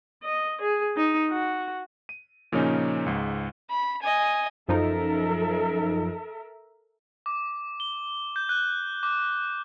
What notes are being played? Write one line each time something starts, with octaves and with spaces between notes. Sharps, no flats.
D#5
G#4
D#4
F#4
D#7
A#2 C#3 F3 A#3 C#4 D#4
C#2 G#2
B5
D#5 G#5
F#2 F3 D#4 A4 A#4 E5
D6
G7
G6
F#6
D6